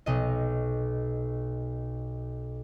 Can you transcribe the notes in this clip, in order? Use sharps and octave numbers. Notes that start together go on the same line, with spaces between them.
B1 D#5